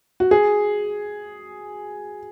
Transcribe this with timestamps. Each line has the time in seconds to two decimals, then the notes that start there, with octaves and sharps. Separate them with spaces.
0.20 F#4
0.31 G#4